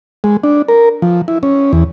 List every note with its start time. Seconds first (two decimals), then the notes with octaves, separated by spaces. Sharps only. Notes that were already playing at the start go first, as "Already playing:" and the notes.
0.24 G#3
0.44 D4
0.69 A#4
1.02 F3
1.28 E4
1.43 C#4
1.73 E2